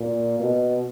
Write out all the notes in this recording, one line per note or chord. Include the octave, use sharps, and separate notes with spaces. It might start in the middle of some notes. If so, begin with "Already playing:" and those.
Already playing: A#2
B2